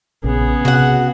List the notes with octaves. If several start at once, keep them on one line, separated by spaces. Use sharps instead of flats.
A#1 C#3 B3 G#4
C3 F#4 F#5